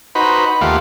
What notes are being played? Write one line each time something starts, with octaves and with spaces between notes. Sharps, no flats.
D#4 F#4 B4 C5 B5
D#2 A3 F4 G4 F5 F#5